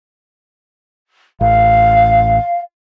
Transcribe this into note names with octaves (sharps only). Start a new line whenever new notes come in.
A1 F5